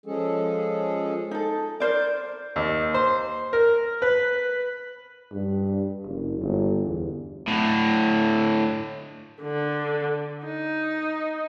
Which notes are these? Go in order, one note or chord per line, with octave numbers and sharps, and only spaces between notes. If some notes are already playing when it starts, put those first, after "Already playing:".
F3 G#3 C#4 G#4 A4
D#4 A4
A#4 C5 D5
D#2
C5
A#4
B4
G2
F#1
G1
E2
A2 D3
D3
D#4